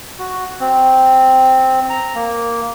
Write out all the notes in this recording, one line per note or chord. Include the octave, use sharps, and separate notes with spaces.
F#4
C4
A#5
A#3